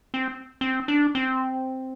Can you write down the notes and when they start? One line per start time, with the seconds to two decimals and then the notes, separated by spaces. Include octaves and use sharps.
0.14 C4
0.61 C4
0.88 D4
1.15 C4